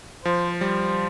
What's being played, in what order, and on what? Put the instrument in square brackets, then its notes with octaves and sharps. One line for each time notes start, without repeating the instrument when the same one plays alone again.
[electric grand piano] F3 [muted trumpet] C5
[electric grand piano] G3 [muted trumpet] C5